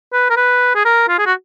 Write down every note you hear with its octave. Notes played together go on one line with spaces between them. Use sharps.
B4
A#4
B4
G#4
A#4
F4
G#4
F#4